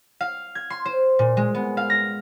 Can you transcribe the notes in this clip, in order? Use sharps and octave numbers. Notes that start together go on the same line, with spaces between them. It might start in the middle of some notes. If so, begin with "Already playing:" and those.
F5
G#6
C6
C5
A#2
G#3
B3
F5
A#6